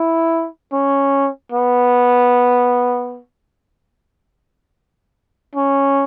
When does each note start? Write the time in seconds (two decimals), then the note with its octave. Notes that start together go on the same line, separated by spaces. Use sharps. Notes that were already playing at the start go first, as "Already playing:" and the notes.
Already playing: E4
0.73 C#4
1.52 B3
5.55 C#4